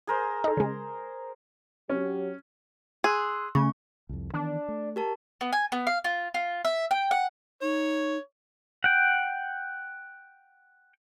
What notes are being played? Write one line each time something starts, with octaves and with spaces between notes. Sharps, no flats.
G#4 A#4 C5
D#4 A4
C#3 G#3
F#3 C#4 G4
G#4 C6 E6 F#6
C#3 A3 C#6
C2 F2
D#3 E3 B3 D4
A3
G4 A#4 A5
B3
G#5
B3
F5
F4
F4
E5
G5
F#5
D#4 C#5
F#5 G5